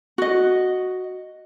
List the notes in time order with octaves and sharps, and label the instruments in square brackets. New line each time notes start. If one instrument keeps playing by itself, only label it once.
[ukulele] F#4 D#5